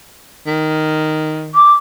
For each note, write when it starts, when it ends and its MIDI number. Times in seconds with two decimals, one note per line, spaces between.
0.47 1.58 51
1.55 1.74 86